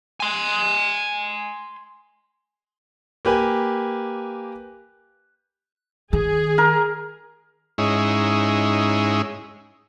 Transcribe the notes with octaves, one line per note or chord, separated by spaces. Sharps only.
G#5 C6
A#3 G4 B4 G#5
D#3 G#4
A#4
G#2 G#3 C#4 D#4 E4